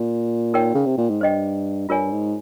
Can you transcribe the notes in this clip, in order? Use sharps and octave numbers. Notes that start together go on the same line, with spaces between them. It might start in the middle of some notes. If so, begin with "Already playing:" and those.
Already playing: A#2
D#4 A#4 C#5 G5
C#3
C3
A#2
G#2
G2 C5 D#5 G5
G2 F4 A#4 C#5 G#5
G#2